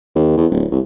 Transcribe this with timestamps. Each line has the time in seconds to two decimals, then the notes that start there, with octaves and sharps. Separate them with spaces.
0.16 D#2
0.37 E2
0.52 D1
0.72 C2